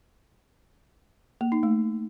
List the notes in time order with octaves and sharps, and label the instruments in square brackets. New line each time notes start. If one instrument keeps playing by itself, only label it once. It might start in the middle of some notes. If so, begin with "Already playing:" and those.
[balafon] A#3
D#4
A3